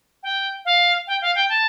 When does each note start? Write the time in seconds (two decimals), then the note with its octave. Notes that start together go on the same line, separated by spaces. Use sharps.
0.23 G5
0.65 F5
1.07 G5
1.22 F5
1.35 G5
1.49 A5